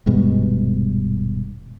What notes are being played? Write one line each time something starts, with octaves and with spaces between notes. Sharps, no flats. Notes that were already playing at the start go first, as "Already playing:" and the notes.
D#1 G2 B2 G#3